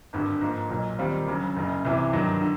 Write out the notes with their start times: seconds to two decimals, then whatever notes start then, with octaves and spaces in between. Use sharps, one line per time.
0.13 G#1 G2 D3
0.41 G#2 F3 A#3
0.69 B1 A#2 F#3
0.99 D#2 D#3 G3 C4 F4
1.28 D2 C#3 F#3
1.57 F#1 F#2 C#3
1.85 C2 C3 E3
2.13 G2 D#3 F#3
2.41 D3